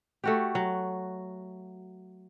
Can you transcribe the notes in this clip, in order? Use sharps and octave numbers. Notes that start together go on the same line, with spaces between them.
A3 F#4 G4
F#3